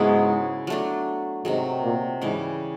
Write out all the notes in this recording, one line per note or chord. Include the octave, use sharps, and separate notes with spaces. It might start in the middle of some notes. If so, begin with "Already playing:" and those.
Already playing: G#2 C#3 F#3 G#3 B3 E4
F#3 A3 D4
G#2 C3 D#3 F#3 G#3
A#2 A#3
G#2 C#3 E3 G3 G#3